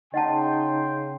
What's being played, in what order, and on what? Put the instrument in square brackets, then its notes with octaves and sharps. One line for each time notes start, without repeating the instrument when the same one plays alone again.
[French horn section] C#3 [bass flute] D#4 [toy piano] D#5 F#5 A5 [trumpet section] G5 C6